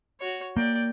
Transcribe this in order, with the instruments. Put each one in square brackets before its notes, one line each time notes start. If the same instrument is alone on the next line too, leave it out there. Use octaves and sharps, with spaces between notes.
[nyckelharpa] F#4 C#5
[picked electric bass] A#3 [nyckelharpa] D5 G5